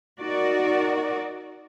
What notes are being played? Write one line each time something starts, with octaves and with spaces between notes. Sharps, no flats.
D#4 F#4 A#4 D5